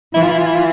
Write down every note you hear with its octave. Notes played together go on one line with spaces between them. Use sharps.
E3 E4
F4
E4
F4
E4
F4